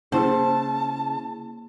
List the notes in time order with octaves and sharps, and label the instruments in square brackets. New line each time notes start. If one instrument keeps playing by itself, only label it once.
[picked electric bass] C#3 [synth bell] A#3 E4 G#4 [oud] C5 [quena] A5